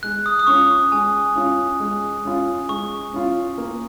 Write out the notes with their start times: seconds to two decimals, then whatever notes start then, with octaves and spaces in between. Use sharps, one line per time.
0.03 G#3 F#6
0.26 D#6
0.39 D#6
0.47 C#4 F4 C#6
0.92 G#3 G#5
1.35 C#4 F4
1.80 G#3
2.25 C#4 F4
2.69 G#3 C#6
3.13 C#4 F4
3.58 A#3